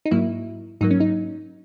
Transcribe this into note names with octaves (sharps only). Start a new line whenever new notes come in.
D#4
G#2 F#3 A#3 E4
G#2 F#3 A#3 D#4
C#4
D#4